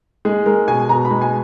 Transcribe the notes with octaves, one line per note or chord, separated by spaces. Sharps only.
G#3 G#4
G#3 A#4
B2 G#5
B2 A#5
B5
G#3
G#5